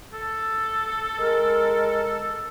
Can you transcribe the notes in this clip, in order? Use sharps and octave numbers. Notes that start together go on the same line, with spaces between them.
A4
G#3 A#4